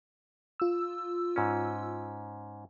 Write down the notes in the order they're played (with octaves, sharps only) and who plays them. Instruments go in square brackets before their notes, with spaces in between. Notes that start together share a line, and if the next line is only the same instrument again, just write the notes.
[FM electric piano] F4 E6
[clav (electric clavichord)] G#2 C#4